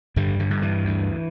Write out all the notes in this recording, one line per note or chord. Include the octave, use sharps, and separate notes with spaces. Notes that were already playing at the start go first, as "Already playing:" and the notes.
G2 D3 G3
D3
G2
E3
D2